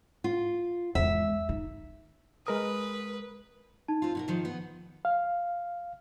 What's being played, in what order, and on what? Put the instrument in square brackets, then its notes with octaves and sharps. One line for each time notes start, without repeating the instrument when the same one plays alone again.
[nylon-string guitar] F4
[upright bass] E2 G#3 [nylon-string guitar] E5
[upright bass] D#4
[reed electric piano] G#3 A#4 D#6 [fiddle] B4
[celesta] D#4 A5
[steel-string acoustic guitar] C4 F4
B2 F#4 A#4
G#2 D#3 F3
B3
[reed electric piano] F5